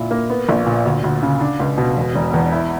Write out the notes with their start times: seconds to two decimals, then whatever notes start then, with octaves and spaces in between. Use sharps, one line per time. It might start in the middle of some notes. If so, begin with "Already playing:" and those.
Already playing: A#2 E4
0.11 A#3
0.30 B3
0.49 A#1
0.66 A#2
0.85 D2
1.04 D2
1.23 C#3
1.40 D4
1.60 C#2
1.78 B2
1.96 E1
2.15 E1
2.34 E2
2.52 E4